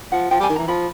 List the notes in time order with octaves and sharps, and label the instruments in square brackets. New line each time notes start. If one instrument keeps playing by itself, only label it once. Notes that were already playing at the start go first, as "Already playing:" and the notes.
[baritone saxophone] F3 [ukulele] F#5
[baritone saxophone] F3 [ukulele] G5
[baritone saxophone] G3 [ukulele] G#5
[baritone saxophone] D#3
[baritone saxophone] E3 [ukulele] A#5
[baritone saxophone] F3 [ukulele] B5